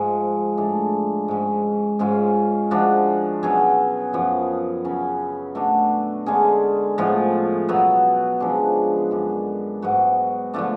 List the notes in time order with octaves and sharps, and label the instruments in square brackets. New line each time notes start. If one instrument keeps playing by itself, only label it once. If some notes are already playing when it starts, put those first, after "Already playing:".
Already playing: [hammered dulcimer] G#2 F3 G#3
A2 G#3 D4
G#2 G#3 C#4
G#2 G#3 C#4 F4
F3 G#3 D4 F#4
B2 F#3 C#4 G#4
F#2 F3 B3
C#3 F#3 C#4
B2 A3 D4 F#4
D3 G#3 C#4 G#4
A2 F3 G#3 B3
B2 F#3 B3 F#4
C#3 F3 G#3 D4
F#2 D3 G#3
G#2 F#3 B3 F#4
D3 F3 A3 D4